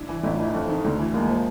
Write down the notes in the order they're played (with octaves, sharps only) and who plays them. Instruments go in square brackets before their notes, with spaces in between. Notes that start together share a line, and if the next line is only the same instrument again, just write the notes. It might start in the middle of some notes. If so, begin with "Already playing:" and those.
Already playing: [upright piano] D4 E4
[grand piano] E3
[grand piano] A1 [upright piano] D4 E4
[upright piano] D#4 F4
[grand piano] E3 [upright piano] D4 E4
[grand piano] F2
D#3
D2
E3
[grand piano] D#2 [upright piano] G#3 A#3
[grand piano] F3